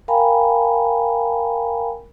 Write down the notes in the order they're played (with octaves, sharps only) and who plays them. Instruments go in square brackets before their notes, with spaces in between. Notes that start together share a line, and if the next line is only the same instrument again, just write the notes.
[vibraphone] A#4 F5 G5 G#5 A#5 B5